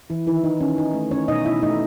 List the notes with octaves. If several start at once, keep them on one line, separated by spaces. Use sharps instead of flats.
E3 E4
D#3 E3 E4
D#4
D#3 C#4
D#4
A3
C#4 C#5
B2 D#4 D#5
E4 E5
A3 D#4 D#5